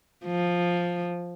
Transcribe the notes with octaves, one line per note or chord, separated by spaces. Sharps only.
F3